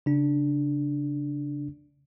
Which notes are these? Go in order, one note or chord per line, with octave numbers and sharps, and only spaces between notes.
C#3 D4